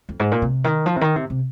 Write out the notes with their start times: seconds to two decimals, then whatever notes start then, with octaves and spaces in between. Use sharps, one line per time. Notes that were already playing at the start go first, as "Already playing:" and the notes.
0.09 F2
0.20 G#2
0.32 A#2
0.42 C3
0.64 D#3
0.86 F3
0.96 C3
1.01 D#3
1.16 C3
1.30 C3